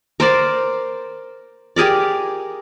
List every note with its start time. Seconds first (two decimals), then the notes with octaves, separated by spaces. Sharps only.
0.20 A#4 C5 D5
1.76 G4 G#4 A#4 D5